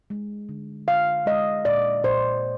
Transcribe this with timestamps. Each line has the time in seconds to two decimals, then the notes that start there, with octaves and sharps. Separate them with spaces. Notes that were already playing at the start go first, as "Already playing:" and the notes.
0.10 G#3
0.49 D3
0.87 D3 F5
1.26 G#3 D#5
1.65 A#2 D5
2.04 A#2 C5